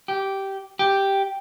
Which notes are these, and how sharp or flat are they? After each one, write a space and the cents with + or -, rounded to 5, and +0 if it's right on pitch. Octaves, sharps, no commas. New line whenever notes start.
G4 -10
G4 +0